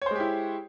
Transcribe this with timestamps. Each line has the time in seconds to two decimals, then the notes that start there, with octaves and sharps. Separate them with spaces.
0.02 C#5
0.06 C5
0.11 G#3
0.15 G4
0.20 E4